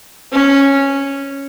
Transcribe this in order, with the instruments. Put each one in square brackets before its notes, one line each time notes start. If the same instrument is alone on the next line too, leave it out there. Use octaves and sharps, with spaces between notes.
[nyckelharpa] C#4